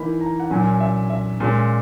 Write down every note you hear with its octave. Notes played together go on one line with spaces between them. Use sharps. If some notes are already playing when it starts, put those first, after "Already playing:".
Already playing: E3 A#3 D#4 B5
A#5
F#5
A#2 F#3 C#4 G#5
E5
E5
A#2 G#3 C#4